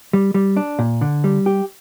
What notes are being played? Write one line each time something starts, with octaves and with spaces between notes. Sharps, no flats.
G3
G3
D4
A#2
D3
G3
G4